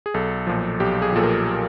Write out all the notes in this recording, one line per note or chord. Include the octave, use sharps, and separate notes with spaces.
G#4
B1 A4
A#2 F3
B1 G4
G#4
A#2 F3 A4
A#4